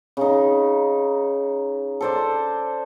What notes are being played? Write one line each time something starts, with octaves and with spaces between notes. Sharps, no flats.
C#3 D#4
A4 C5 D5